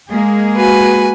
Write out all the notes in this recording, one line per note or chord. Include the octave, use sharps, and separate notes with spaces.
G#3 A#3 G#4
F#4 B4 G#5